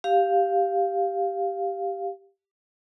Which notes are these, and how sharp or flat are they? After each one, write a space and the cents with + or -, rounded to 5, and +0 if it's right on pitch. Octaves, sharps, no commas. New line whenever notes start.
G4 +0 F5 +0